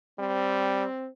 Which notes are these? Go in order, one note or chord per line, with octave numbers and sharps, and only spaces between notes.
G3 C4